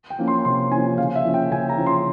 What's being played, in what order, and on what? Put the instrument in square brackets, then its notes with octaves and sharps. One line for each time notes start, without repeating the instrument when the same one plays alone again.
[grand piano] G5
F3 A#3 C#4
C6
C3 C6
F3 A#3 C#4 G#5
C#3 F5
E5
F3 A#3 C#4
G5
C#3 G#5
A#5
F3 A#3 C#4
C6